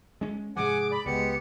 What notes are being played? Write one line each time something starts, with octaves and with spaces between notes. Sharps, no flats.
G#3 C#4
G#2 C3 F3 G#4 F#5 G#5 D6
D5 B5
C#2 G#3 B3 G4 C#7